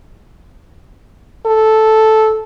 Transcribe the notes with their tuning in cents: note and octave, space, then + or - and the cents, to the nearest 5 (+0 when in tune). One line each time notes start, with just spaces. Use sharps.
A4 -5